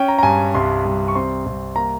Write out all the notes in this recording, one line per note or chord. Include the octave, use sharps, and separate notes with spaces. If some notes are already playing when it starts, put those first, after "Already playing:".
Already playing: C#4 G5
A#5
A#5
G2 G#5
C2 C6
C2
C#6
C4 C6
C2
A#3 A#5